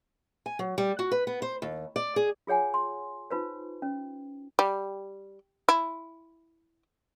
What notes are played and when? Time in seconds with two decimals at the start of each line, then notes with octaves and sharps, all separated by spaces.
0.46 G#5
0.59 F#3
0.78 G3
0.99 F#4
1.11 B4
1.27 B3
1.42 C5
1.62 D#2
1.96 D5
2.16 G#4
2.47 F4 G#4 C#5 F#5 G#5
2.74 C6
3.30 D#4 F4 B4 C5
3.82 C#4
4.59 G3
5.69 E4